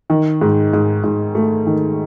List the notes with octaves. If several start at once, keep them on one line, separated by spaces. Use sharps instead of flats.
D#3
G#2
G#2
G#2
A3
D#3